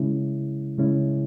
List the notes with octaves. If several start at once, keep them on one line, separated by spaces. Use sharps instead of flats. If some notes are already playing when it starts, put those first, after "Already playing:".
Already playing: C#3 G#3 C#4 E4
C#3 G#3 C#4 E4